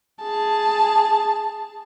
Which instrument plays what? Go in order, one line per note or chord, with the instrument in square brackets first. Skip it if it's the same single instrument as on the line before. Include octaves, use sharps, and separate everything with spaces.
[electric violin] G#4 A5